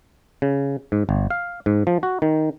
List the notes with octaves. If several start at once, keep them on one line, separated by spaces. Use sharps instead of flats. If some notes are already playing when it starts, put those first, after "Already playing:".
C#3
G#2
G1
F5
G#2
F3
F#4
D#3